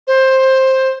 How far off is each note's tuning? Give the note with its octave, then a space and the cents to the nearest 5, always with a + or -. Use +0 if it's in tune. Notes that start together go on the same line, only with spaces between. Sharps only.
C5 +10